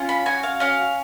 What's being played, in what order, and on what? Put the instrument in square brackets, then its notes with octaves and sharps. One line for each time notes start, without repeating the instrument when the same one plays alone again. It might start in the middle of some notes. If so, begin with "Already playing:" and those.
Already playing: [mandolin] C#4 F4
B5
F#4 G#5
F5
C#4 F5